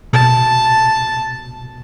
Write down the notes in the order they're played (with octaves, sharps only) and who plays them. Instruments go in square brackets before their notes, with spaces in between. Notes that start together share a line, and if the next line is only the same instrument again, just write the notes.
[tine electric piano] B2 [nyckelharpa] A5